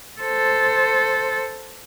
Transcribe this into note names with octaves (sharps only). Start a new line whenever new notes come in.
A4 C5